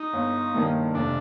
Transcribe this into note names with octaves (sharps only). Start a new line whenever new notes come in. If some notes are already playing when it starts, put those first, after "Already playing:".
Already playing: D#4
G1
G2 D#3 A#3
F1 D4